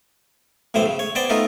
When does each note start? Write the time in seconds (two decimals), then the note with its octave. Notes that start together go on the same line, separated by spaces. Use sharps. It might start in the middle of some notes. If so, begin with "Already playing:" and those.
0.74 B1 A2 E3 C5
0.86 C#3
0.99 C#5
1.15 B3 C5 D5 G5
1.30 A3 B3 D#4 F4